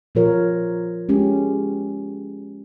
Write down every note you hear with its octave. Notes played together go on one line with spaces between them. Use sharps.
A#2 F3 F4 A#4 C#5
G#3 C#4 G4